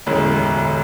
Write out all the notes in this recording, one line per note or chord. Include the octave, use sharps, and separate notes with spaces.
E1 A1 D2